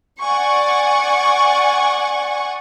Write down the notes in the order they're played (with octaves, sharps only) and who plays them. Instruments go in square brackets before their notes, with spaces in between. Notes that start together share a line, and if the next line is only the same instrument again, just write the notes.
[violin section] D5 F#5 G#5 C#6